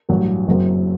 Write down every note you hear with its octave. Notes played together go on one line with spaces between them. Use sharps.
A1 G2 F#3
F#1 F#2 F#3 C4